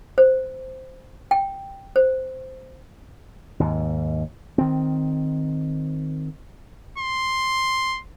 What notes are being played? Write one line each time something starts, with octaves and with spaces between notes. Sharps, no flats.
C5
G5
C5
D#2 G#2
D#3 C4
C6